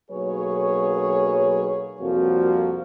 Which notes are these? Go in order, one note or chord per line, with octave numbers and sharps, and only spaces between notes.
B1 F#3 A#3 G#4 B4 C#5
C2 F2 F3 A#3 F#4